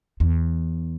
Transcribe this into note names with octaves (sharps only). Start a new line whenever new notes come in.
E2